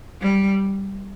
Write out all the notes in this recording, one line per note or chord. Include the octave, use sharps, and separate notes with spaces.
G3